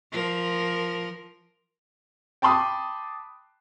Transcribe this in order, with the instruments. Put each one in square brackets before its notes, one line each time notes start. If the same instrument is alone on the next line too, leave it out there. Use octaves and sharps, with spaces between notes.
[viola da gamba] F3 A#4
[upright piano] G5 A5 B5 C6 D6 D#6